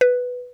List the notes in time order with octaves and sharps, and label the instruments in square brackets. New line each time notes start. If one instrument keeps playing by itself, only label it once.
[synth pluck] B4